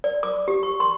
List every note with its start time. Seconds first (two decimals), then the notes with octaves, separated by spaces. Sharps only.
0.04 D5
0.23 D6
0.48 G4
0.63 C#6
0.80 C6